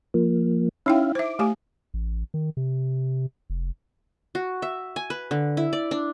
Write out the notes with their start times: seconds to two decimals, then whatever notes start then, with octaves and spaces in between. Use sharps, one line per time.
0.14 F3 A#3
0.86 C#4 D#4 E4 E5 F5 G5
1.15 C5 E5 D6
1.39 A3 G4 G#5
1.94 A1
2.34 D#3
2.57 C3
3.50 F1
4.35 F#4
4.62 E5
4.96 G#5
5.10 B4
5.31 D3
5.57 E4
5.73 D5
5.91 D4